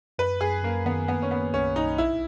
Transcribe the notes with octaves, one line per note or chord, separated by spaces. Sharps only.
F#2 B4
F#2 G#4
F#2 A#3
D#3 B3
A#3 B3
C#4
A#3 B3
B1 C#4
B1 D#4
A#1 E4